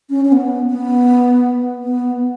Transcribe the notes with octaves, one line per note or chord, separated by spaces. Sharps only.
C#4
C#4
B3
B3
B3